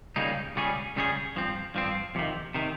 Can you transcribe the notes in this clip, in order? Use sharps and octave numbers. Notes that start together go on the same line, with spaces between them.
C#2 C#3 G3 A#3 D#4
C#2 C#3 G3 C#4 G#4
C#2 C#3 G3 C#4 G#4
G2 F3 C4
G2 F3 C4
F2 C3 D#3
C3 D#3